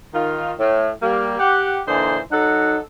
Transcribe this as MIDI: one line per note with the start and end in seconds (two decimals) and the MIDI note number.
0.14 0.53 51
0.14 0.53 65
0.59 0.90 45
1.02 1.37 55
1.02 1.37 58
1.39 1.79 67
1.39 1.79 78
1.87 2.18 46
1.87 2.18 50
1.87 2.18 52
1.87 2.18 63
1.87 2.18 72
1.87 2.18 84
2.31 2.77 54
2.31 2.77 63
2.31 2.77 69
2.31 2.77 78